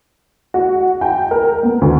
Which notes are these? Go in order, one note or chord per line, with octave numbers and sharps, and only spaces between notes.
F#4
G5
A#4
B3
D2